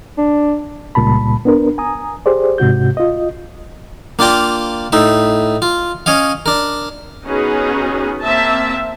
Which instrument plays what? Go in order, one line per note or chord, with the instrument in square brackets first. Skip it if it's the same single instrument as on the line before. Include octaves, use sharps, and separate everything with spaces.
[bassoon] D4
[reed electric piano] C#2 A#2 G3 A5 B5
B3 D4 A#4
G#5 A#5 D#6
G4 G#4 C5 D5
G#2 C3 F#4 G6
F4 D#5
[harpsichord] A#3 D4 F4 G5 A#5
A2 D#4 E5
F4
C#4 C#5 D#5 F5
D4 A#4
[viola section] B3 C#4 D#4 F#4 G#4
A#3 C4 E5 A5